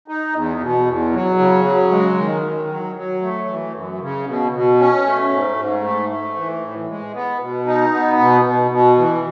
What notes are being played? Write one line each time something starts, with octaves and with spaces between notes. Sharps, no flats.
D#4
E2
B2
E2
F#3
C#3
F#3
G#3
D#3
D#3
F#3
F#3
A3
E3
F#2
C#3
B2
B2
C#4
A3
G#2
G#2
A3
A3
E3
A2
G#3
B3
B2
D#4
B3
B2
B2
B2
E3